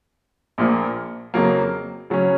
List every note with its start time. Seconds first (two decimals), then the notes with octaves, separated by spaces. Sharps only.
0.58 A#1 A#2 F3 A#3
1.34 F2 C#3 F#3 A#3
2.10 C#3 F#3 C#4